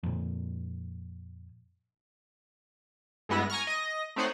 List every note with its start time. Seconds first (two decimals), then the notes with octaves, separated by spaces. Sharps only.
0.03 F2 A#2
3.29 G2 G#3 B3 E4 A#6
3.50 G#5 A#5 C#6 F6
3.67 D#5 A#6
4.16 A3 C4 D#4 C5 C#5 F#5